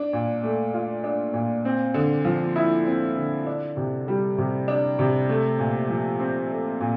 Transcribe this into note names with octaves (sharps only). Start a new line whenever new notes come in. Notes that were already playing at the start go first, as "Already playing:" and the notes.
Already playing: D4
A#2
A3
F4
D4
A#2
C4
D3
F3
E4
C4
D3
D4
C3
G3
C3
D4
C3
A3
A#2
F3
C4
A3
A#2